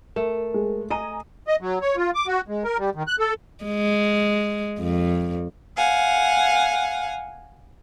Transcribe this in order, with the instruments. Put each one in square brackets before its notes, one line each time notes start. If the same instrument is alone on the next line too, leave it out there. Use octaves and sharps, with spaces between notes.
[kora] A3 [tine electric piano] A#4
[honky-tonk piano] G#3
[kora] D#5 [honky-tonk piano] G#5 A#5 D#7
[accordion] D#5
F#3
C#5
F4
D6
F#4
G#3
A#4
G3
D#3
F#6
A4
[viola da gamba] G#3
F2
[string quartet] F5 F#5 G#5